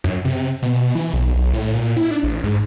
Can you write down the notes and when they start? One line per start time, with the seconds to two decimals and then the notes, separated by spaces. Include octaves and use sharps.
0.04 F#2
0.25 C3
0.62 B2
0.95 E3
1.13 B1
1.35 B1
1.53 A2
1.74 A#2
1.97 E4
2.11 D4
2.23 A1
2.44 G#2